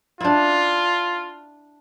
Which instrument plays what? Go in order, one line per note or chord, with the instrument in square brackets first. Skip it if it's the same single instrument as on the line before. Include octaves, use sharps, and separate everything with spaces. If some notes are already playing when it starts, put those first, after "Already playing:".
[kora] D4 E4 [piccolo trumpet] F4